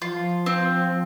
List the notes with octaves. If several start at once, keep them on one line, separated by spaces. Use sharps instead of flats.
F3 F4
C4